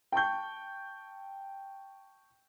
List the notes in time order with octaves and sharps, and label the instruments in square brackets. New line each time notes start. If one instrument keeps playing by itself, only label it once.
[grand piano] G5 A5 C#6 G6